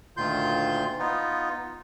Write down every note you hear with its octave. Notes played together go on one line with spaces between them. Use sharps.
D2 A#2 D#3 F4 C6 G6
B3 D#4 F4